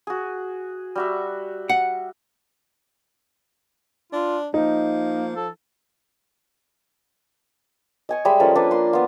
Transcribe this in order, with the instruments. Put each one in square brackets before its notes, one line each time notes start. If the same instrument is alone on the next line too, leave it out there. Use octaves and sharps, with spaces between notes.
[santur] F#4 G#4
G3 F#4 E5
[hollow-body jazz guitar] F#5
[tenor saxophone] D4 [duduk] F4
[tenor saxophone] F3 [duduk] A#3 [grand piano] D#4
[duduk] A4
[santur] D#5 G#5 C#6
G3 G#3 E5 B5
F3 C#4 A4 A#4
A#3 D4 B4
A#3 C6
B3 F4